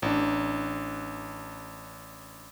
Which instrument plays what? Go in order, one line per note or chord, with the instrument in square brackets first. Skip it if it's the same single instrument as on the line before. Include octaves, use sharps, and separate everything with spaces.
[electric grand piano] A1 D4